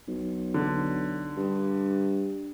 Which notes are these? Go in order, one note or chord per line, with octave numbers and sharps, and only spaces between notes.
B1
D3
G2